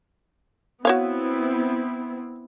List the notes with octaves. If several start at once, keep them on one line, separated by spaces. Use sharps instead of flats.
B3 C4 E4 F#4 C#5 F5